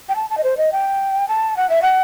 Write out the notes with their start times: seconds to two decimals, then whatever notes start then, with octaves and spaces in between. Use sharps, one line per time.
0.09 G5
0.16 A5
0.30 A5
0.38 D#5
0.44 C5
0.57 D#5
0.72 G5
1.28 A5
1.57 F#5
1.70 E5
1.82 F#5